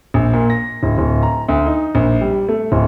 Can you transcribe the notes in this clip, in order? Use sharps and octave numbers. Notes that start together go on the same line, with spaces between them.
A#1
A#2
A#6
D1
D1
A#5
D2
D#4
A#1
G3
A3
D1